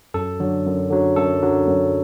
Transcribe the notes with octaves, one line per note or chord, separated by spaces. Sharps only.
F#2 A4
D3 F#3
F#2
D3 F#3
F#2 A4
D3 F#3
F#2